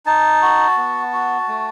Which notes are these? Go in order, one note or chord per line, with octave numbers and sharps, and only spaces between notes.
D#4 A5
F#4
B3
F#4
A3